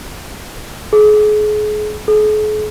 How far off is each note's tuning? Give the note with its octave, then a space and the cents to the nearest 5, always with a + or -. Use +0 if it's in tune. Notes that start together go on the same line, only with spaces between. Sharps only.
G#4 +30
G#4 +45